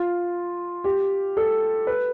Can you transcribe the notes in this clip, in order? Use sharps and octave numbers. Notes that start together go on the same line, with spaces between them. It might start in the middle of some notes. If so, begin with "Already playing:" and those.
Already playing: F4
G4
A4
B4